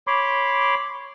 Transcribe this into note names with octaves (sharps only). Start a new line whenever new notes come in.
C#5 B5 C6 D6